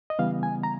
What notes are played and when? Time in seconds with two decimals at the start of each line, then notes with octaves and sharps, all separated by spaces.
0.10 D#5
0.19 C#3 E3 G3 B3 F5
0.43 G#5
0.63 A#5